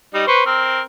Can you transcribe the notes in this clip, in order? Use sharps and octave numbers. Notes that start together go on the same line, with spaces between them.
G3 D#4
B4 C5 C#6
C4 A#4